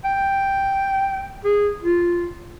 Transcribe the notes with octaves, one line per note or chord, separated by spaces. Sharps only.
G5
G#4
F4